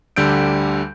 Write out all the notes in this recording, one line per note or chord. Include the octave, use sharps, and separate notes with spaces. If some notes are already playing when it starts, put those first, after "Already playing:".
D2 D3 G3 E6 G6 D7